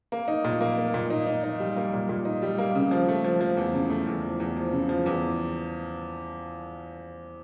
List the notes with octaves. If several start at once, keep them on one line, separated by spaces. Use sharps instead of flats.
A#3
D#4
A#2
A#3
A#3
A#2
D#4
D#4
D#4
G3
A#3
A#2
A#2
D#4
G3
A#3
C#3
F3
A3
F3
F3
E2
C#3
A3
E2
F3
E2
F3
C#3
F3
E2